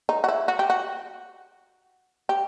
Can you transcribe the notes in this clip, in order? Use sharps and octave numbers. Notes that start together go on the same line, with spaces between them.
D#4
F#4
E4
F#4
G4
F#4
G4